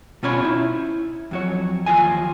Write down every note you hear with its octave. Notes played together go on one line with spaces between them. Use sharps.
B2 C#4 F4 C#5 B5
D#4 E4
F2 F#3 C#5
D#2 F3 F4 D#5 G#5